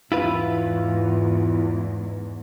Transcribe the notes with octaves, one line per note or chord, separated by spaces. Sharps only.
E2 G#2 E4 F4 B4